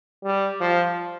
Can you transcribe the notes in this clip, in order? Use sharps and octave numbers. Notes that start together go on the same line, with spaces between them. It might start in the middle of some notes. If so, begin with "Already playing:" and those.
G3
F3